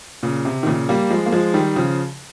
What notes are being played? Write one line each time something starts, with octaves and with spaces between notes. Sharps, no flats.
A#2 C#3
C3
D#3
A#2 C#3
G3 A#3
F3 G#3
A#3
F3 G#3
D#3 G3
C#3 F3